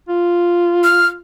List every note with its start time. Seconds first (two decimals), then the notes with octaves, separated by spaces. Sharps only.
0.09 F4
0.84 F6